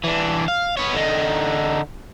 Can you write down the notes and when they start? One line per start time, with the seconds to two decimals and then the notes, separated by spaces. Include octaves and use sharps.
0.04 E3 D4
0.48 F5
0.77 B3 C#5
0.94 D3 D#4